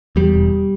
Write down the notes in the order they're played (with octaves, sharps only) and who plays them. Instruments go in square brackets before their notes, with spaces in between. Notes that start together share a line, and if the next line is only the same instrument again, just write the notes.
[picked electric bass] E2 G3
E1